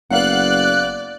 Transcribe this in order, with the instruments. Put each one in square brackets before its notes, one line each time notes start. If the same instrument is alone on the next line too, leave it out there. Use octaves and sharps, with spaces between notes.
[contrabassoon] F#1 [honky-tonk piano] B3 F5 F#5 [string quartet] D5 [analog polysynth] F#6